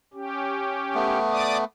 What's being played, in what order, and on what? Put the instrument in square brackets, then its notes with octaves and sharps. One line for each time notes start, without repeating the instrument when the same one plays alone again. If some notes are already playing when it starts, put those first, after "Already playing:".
[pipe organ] C#4 G4
[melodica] A3 B3
[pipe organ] D5 D6 D#6